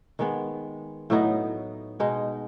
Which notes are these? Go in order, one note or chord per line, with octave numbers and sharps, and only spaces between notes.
D#3 G#3 B3
A2 F#3 B3 D#4
B2 G#3 D#4